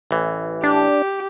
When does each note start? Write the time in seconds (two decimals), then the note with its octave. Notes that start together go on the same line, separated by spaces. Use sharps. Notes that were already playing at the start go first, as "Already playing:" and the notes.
0.11 A1 E3
0.64 D4 G4